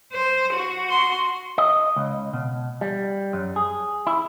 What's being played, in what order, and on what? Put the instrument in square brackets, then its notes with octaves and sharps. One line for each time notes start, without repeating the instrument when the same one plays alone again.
[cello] C5
F#4
[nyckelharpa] C6
[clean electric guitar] D#5
C#2
B2
G3
F#2
G#4
E4